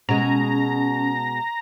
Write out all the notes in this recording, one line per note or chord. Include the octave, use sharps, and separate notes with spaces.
B2 G#3 C#4 A#5